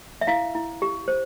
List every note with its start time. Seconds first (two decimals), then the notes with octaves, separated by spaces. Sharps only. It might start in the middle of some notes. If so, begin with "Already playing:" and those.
0.21 E5
0.27 E4 F5
0.55 E4
0.82 G4
1.08 C5